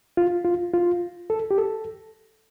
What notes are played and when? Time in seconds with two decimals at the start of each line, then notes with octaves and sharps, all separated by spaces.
0.17 F4
0.45 F4
0.73 F4
1.30 A4
1.51 G4
1.58 A4